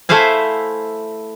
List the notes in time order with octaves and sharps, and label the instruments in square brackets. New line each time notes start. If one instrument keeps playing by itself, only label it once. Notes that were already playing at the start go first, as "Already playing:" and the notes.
[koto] A3 E4 C5 F5 G#5